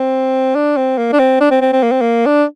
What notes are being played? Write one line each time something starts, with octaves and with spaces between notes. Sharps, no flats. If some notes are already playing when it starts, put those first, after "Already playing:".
Already playing: C4
D4
C4
A#3
D4
C4
D4
C4
C4
C4
A#3
C4
A#3
D4